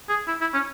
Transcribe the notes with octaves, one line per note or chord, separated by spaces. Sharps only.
G#4
E4
E4
C#4